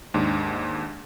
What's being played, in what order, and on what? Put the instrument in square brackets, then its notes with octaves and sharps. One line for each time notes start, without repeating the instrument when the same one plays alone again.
[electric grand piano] D#2 G#2 D4